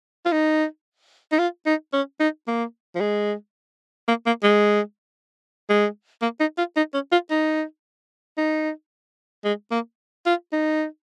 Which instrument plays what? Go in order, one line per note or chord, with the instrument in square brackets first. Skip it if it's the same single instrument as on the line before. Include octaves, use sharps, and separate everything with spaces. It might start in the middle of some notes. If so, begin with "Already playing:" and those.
[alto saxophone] F4
D#4
D#4
F4
D#4
C#4
D#4
A#3
F3
G#3
A#3
A#3
G#3
G#3
A#3
D#4
F4
D#4
C#4
F4
D#4
D#4
G#3
A#3
F4
D#4